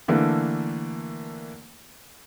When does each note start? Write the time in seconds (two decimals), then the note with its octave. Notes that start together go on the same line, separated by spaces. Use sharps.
0.08 D3 E3 A3 A#3